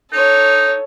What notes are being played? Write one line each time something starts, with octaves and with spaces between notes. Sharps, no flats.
D#4 A4 C#5